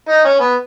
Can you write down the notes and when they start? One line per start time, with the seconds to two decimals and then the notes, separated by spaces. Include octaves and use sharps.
0.09 D#4
0.25 C#4
0.40 B3